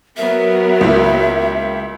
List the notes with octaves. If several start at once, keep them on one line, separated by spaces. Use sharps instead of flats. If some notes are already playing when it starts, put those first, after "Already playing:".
F#3 B3 A#4 E5
C#2 A#3 E4